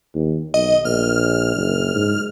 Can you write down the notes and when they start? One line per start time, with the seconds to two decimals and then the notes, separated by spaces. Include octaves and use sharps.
0.14 D#2
0.54 B1 D#5
0.85 A#1 F6
1.56 F#1
1.95 G#2